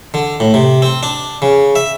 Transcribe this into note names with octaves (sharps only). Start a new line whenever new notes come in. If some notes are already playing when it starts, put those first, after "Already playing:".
D3
A2
C3
C4
D4
C#3
E5